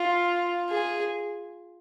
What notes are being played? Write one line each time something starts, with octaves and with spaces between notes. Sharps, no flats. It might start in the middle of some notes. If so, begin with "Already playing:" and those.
Already playing: F4
G#4